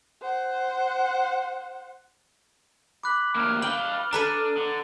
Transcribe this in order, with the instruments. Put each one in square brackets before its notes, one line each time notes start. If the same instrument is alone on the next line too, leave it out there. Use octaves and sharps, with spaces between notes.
[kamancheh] C5 F#5
[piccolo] B5 [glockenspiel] D6 F#6
[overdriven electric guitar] D2 A#3 [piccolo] F6
[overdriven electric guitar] B4 F5 [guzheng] G5 [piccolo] F6 [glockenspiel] F#7 G7
[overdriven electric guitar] D4 [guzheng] A4 B4 G#5 [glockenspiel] A#5 D#7
[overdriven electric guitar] D3